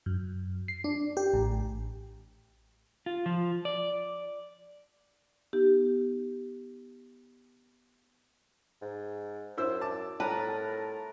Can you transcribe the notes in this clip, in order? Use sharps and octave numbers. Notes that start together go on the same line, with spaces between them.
F#2
C7
D4
G4
A1
F4
F3
D5
B3 D#4 G4
G#2
F#2 E4 C5 E6
A5 D6
A2 A#4 B4 A5 A#5